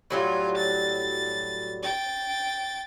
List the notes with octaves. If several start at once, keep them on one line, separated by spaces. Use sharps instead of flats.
A2 F#3 G3 F4
A6
G5 A6